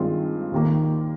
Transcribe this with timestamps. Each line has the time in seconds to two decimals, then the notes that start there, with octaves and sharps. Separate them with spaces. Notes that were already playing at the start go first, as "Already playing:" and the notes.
Already playing: G2 D#3 G#3 C4 F4
0.51 D#2 D#3 A#3